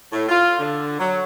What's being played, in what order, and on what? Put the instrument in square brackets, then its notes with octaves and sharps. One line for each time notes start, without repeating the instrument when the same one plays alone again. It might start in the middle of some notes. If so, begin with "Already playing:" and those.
[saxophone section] A2
F4
D3
F#3